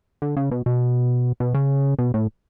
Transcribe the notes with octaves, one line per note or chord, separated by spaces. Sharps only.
D3
C#3
B2
B2
B2
C#3
B2
A2